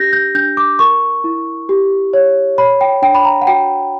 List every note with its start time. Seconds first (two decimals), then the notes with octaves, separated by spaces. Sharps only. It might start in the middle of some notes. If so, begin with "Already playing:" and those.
Already playing: D4 G4 G6 A#6
0.13 G6
0.35 D4 G6
0.57 D6
0.79 A#4 C#6
1.24 E4
1.69 G4
2.13 C#5
2.58 C#5 B5
2.81 G5
3.02 D4 G5
3.15 B5
3.25 A#5
3.42 F#5
3.47 F#4 G5